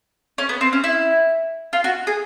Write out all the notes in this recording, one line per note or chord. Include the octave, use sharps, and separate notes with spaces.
C#4
B3
C4
C#4
E4
F4
F#4
G#4